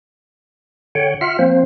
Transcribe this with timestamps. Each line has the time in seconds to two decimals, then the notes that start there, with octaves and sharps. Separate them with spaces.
0.95 D3 C#5 F#5 G5
1.21 F4 E5 F#5 F6
1.39 F3 A#3 C4 C5